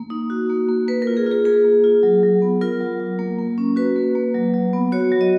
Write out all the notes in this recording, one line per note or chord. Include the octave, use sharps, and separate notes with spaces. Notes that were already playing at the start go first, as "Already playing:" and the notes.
Already playing: A#3
D#4
F#4
A#3
A#3
A#3 B4
A#4
F4
G#4
F4
G#4
A#3 G#4
A#3
F4
F#3
F#3
B3
F4 A#4
F#3
F#3
A#3
A#3
C#4
F#4 B4
A#3
A#3
F#3
F#3
B3
F#4 C#5
F#3
D#5